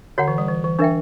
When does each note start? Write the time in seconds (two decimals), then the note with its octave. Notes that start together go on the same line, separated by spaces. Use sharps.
0.18 D3 F#4 C#5 F#5
0.28 E3
0.38 G3
0.48 E3
0.64 E3
0.79 E3 D4 A#4 E5 G5